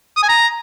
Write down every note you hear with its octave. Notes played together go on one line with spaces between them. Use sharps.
D#6
G#5
A#5